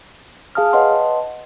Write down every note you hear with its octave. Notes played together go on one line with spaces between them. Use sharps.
G#4 F5 A5 D#6 F6
B4 C#5 D#5 F#5 A5 C6